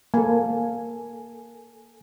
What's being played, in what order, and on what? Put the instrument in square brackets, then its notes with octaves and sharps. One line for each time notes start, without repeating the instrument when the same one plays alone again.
[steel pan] A#3 [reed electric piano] A4 G#5